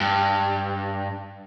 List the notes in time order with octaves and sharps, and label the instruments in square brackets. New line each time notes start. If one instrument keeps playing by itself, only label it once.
[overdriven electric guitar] G2